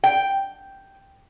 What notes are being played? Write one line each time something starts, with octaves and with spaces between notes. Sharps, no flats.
G5